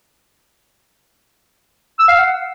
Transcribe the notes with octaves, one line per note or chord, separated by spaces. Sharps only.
E6
F5
F#5